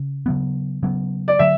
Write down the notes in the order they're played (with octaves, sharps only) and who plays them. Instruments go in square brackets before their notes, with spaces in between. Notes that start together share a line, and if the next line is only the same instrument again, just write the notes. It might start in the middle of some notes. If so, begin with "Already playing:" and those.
Already playing: [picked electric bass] C#3
C#3 F#3 B3
C#3 F#3 B3
[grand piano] D5
[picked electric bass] D3 F#3 [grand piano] E5